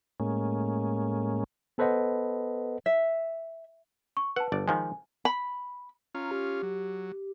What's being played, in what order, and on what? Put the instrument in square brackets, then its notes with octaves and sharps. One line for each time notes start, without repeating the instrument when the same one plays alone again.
[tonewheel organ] A2 G#3 A#3 C#4
[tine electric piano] B3 A4 B4 C5 D#5 F#5
[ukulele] E5
[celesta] C#6
[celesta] B4 A5 [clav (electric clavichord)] F#5
[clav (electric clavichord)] G1 D5
[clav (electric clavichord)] D#3 F3 G#3 [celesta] G#5
[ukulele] B5
[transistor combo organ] C#4 F4 [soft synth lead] A#5
[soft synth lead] G4
[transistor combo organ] F#3